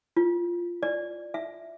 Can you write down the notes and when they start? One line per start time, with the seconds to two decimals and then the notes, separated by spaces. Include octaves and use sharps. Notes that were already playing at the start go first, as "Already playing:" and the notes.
0.17 F4
0.83 D5
1.34 E5